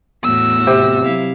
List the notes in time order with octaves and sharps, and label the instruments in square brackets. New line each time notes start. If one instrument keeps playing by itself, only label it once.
[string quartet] E2 A2 F#4 [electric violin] E6
[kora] C3
[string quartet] F#3 E4 F5